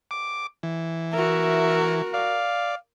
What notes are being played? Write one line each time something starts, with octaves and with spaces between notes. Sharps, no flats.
D6
E3
F#4 A#4 E5
D5 F5